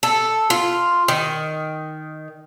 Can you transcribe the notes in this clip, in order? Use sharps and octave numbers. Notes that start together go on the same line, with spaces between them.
A4
F4
D#3